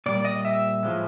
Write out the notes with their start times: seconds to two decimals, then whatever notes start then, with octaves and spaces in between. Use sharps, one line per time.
0.06 A#2 G3 D5
0.25 D#5
0.45 E5
0.83 A2 F3 G#3